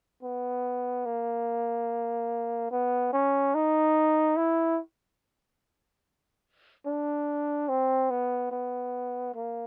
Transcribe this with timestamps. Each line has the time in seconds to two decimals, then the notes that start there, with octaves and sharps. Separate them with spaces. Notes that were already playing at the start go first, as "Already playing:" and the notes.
0.23 B3
1.05 A#3
2.71 B3
3.13 C#4
3.55 D#4
4.37 E4
6.86 D4
7.69 C4
8.10 B3
8.51 B3
9.34 A#3